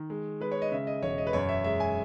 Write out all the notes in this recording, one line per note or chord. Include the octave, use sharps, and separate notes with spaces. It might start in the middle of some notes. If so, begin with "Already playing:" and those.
Already playing: D#3
G#3
G#3 B4
C#5
D#5
C#3 E5
D#5
E1 C#5
D#5
B4
F#2 C#5
E5
G#3 E5
G#5